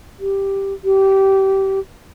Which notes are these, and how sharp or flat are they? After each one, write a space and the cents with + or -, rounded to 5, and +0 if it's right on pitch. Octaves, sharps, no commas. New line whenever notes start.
G4 +0
G4 -20